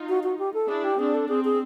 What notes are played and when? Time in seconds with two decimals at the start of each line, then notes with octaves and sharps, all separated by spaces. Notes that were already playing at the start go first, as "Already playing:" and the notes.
Already playing: D#4 F4
0.09 F#4
0.23 F#4
0.39 G4
0.54 A4
0.68 D4 E4 G#4
0.84 G4
0.99 C4 D4 G#4
1.14 A4
1.29 C4 G#4
1.45 G#4